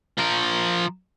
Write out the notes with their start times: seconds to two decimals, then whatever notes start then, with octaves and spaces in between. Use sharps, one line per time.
0.18 F3 A#4